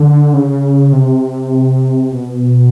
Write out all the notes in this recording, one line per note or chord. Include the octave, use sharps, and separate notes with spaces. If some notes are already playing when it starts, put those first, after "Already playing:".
Already playing: D3
C#3
C3
B2